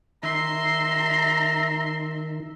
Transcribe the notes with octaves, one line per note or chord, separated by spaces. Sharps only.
D#3 E5 A#5 C6